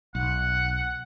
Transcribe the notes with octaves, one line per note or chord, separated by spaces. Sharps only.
B1 F#5